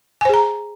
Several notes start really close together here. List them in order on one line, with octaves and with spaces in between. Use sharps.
G#5 C5 G#4 A#5